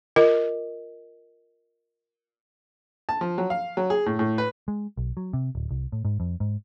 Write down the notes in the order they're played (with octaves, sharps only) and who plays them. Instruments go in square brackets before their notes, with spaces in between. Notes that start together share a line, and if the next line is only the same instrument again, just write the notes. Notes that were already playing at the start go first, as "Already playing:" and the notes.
[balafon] F4 A#4 D#5
[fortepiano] A5
F3
F#3
F5
F#3
G#4
A2
A2
B4
[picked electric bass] G#3
B1
F#3
C3
D1
C2
A2
G#2
F2
G#2